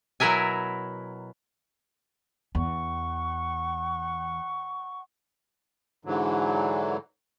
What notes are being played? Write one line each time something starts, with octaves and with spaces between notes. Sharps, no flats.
B2 F#3 E4 A#4 E5 G#5
E2 F#5 C#6
G#2 D3 E3 F#3